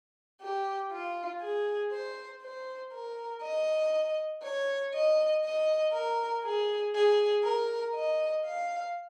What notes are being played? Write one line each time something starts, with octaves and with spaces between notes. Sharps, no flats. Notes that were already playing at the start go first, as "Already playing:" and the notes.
G4
F4
G#4
C5
C5
A#4
D#5
C#5
D#5
D#5
A#4
G#4
G#4
A#4
D#5
F5